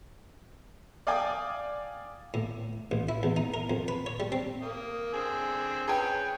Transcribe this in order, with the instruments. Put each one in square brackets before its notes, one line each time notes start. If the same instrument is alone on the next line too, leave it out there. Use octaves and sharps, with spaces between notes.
[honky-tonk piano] D5 F5 G5 G#5 D6 D#6
[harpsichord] A2
A1
E4
E2
D#4
A#4
F2
B4
C#5
G3
C4
[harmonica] A#3 D#6
D3 C4 G#4
[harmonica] C#4 [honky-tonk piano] G#4 B4 G5